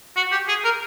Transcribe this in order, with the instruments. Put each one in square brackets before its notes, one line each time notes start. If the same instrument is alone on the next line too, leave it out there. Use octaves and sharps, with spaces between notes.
[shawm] F#4
G4
G#4
A#4